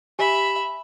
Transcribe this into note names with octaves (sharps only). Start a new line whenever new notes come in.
G4 E5 G#5 B5